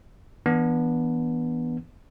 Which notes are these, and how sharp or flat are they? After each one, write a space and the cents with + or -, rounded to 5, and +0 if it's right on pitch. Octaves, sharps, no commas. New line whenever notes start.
E3 -15 B3 -20 D4 +0